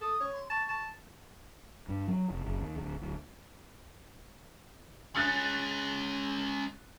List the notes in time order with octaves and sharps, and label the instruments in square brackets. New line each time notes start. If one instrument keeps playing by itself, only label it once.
[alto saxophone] A4 [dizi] D#6
[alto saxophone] C#5
[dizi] C6
[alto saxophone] A5 [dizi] C#6
[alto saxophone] A5
[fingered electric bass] G2
F#3
F1
F#1
D#2
D1
D1
[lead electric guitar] G#3 C#4 [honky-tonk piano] F#6 A6 C#7